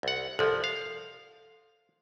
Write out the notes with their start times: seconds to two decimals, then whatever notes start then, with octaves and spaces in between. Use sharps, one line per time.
0.03 C2 F#5
0.39 C2 F3 A4
0.64 F5